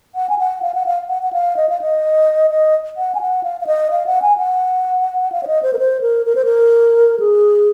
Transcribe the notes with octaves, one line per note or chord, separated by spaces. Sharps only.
F#5
G#5
F#5
F5
F#5
F5
F#5
F#5
F5
D#5
F5
D#5
D#5
F#5
G#5
F#5
F5
F5
D#5
F5
F#5
G#5
F#5
F5
C#5
D#5
C5
A#4
C5
A#4
A#4
C5
A#4
G#4